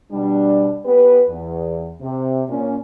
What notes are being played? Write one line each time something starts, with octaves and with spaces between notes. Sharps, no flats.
B2 G3 D4
B3 G4 B4
E2
C3
A#2 C#4